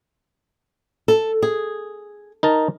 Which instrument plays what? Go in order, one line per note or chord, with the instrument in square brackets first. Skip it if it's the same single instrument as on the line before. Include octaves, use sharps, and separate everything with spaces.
[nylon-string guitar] A4
G#4
[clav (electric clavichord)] D#4 A#4 A5